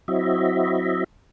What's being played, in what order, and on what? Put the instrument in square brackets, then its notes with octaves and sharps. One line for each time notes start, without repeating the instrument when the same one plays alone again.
[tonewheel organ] F#3 C4 E4 F#4 D#5 E5